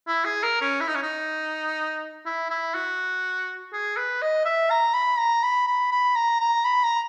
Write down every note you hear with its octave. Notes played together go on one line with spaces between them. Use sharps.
E4
G#4
A#4
C#4
E4
D#4
C#4
D#4
E4
E4
F#4
G#4
B4
D#5
E5
A#5
B5
A#5
B5
B5
B5
A#5
A#5
B5
A#5